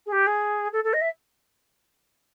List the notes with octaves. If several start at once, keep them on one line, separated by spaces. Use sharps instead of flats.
G#4
G4
G#4
A4
A4
D#5
E5